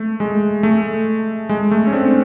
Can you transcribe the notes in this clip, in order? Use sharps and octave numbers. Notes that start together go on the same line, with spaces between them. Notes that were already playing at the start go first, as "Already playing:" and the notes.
Already playing: A3
G#3
A3
G#3
A3
C#4
C4 D4